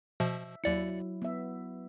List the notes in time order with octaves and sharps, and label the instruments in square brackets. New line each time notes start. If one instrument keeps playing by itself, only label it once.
[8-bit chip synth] B2 F3 [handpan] E5
[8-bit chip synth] D#2 D5 C#7 [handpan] F#3 E4
[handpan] B3 E5